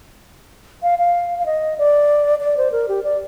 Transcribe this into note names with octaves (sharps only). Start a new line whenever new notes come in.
F5
F5
F5
D#5
D5
D5
C5
A#4
G4
D5